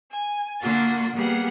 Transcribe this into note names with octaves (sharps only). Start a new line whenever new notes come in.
G#5
D3 A#3 F4 F#4 A6
G3 A#3 B3 G#4 F#5